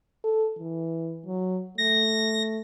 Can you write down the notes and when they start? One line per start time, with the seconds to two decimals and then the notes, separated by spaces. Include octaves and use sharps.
0.24 A4
0.58 E3
1.27 F#3
1.78 A3 A#6